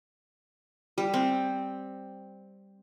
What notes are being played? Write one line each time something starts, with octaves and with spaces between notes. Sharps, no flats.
G3
C4